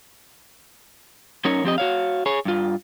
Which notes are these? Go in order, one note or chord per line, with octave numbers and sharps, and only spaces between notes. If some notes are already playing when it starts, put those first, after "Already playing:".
F#2 C#4 D#4 A#4 C#5
F2 C4 G4 D#5
F#4 C#5 F5
G#4 C#5
G2 F4